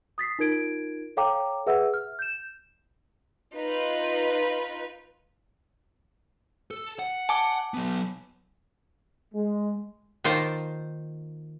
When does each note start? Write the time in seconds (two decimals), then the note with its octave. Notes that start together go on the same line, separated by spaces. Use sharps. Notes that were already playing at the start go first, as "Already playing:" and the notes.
0.18 D#6 A6 B6 C7
0.39 D#4 F4 A#4 G#6 D7
1.17 A4 C#5 F5 G5 A#5 D6
1.67 G#4 B4 E5 F#5 E6
1.94 F6
2.19 G6 E7
3.55 D#4 F4 B4
6.71 A4
6.99 F#5
7.29 G#5 A5 D6
7.74 F#3 B3
9.35 G#3
10.24 D#3 A#3 F4 C5 G5 A5